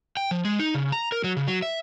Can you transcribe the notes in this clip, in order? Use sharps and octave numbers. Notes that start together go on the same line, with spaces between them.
G5
F3
G#3
D#4
C#3
A#5
A#4
F#3
C#3
F#3
E5